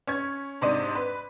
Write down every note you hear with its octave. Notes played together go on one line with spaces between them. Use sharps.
C#4 C#6 G#6
G#2 C3 D4 D5 D#5 D#7
B4